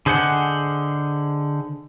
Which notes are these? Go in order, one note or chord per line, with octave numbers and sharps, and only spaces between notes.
D3 G#4 C5 D#5 F#5